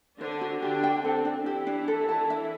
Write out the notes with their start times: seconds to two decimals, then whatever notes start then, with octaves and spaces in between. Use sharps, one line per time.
0.20 D3 D4 C5
0.41 F#4
0.62 D3 D4 G4
0.83 G5
1.04 C4 A4
1.25 D4
1.46 E3 E4 G4
1.67 D4
1.88 A4
2.09 A5
2.30 E5